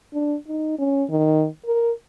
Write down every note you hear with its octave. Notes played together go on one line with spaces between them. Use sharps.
D4
D#4
C#4
D#3
A#4